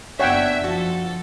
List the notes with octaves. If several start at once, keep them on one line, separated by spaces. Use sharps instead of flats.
F#1 B3 D4 C#5 E5 F#5 G5
F3 F#4 A4